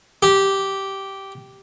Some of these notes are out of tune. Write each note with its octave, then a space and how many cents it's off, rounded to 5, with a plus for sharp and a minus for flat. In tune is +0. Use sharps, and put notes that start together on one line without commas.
G4 -10